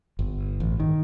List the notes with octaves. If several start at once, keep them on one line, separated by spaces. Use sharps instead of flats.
G1
A1
D#3